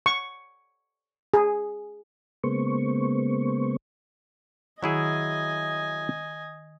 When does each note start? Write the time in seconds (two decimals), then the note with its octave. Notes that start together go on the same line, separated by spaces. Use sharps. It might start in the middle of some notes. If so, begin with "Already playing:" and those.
0.06 C#6
1.34 G#4
2.44 C#3 G#3 A#3 B3 C5 C#6
4.83 D#3 F#3 E4 G#4 D#5 E5 G#5